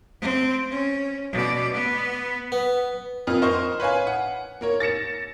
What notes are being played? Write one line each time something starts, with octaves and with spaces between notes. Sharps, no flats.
C4
C#4
B2 D5
B3
B3
F2 A#3 F6
A#4 C5 D#5 C#6
B4 C#5 F5 G#5
F#5
A#3 A#4 C#5
A6 A#6 C#7 E7